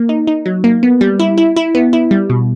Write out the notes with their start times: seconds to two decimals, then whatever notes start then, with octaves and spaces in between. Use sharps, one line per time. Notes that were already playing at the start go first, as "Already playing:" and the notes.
Already playing: A#3
0.09 D#4
0.27 D#4
0.46 F#3
0.64 A#3
0.83 B3
1.01 G3
1.20 E4
1.38 E4
1.56 E4
1.75 B3
1.93 E4
2.11 G3
2.30 B2